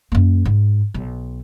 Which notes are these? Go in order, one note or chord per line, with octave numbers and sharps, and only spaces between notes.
F#2 A#3
G#2
B1